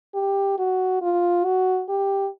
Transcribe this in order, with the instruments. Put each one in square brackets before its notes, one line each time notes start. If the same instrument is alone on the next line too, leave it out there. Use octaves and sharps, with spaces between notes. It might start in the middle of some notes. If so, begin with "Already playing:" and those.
[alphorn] G4
F#4
F4
F#4
G4